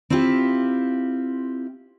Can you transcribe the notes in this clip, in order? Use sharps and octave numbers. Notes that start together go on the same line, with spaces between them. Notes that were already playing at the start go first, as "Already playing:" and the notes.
C4 E4 F4 G4